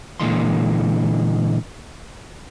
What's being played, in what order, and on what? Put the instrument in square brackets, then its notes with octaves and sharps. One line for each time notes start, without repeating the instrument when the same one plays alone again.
[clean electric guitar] A#2 D3 E3 G#3 A#3 C6